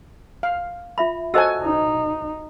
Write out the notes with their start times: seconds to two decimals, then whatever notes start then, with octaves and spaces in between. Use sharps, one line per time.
0.43 F5
0.98 F4 E5 B5
1.34 F#4 A4 C5 D#5 G#5 E6
1.62 D#4